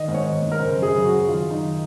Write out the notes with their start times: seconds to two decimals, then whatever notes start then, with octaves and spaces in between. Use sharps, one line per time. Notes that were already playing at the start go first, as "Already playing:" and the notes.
Already playing: D#3 D#5
0.08 G#2
0.14 C#5
0.26 D#3
0.42 G#2
0.52 A#4
0.60 C#3 C5
0.77 F#2
0.82 G#4
0.94 C#3
1.05 F#4
1.10 F#2
1.28 D#3 F4
1.45 F#2
1.51 D#4
1.62 D#3